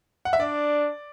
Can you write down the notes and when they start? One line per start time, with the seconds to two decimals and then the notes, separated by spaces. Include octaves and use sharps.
0.25 F#5
0.33 E5
0.40 D4 D5